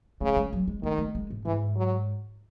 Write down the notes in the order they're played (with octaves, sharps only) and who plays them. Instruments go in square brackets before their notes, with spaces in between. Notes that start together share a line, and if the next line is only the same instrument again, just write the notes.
[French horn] C#3 [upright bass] A3
[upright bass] G#3
F#3
G#3
[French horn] D#3 [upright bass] A3
[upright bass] A3
G#3
A2
[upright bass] G#2 [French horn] E3
[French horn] F#3